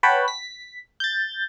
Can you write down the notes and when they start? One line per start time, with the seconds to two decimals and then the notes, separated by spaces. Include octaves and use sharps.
0.03 B4 C#5 F#5 G5 A5 B5
0.28 B6
1.00 G6 A6